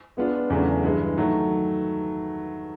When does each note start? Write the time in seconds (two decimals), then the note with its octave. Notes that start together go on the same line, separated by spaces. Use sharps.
0.17 G#3 B3 D4 F4
0.50 E2 C#3 F#3 A3 D4
0.84 G2 E3 G#3
1.18 D#3 F#3 A3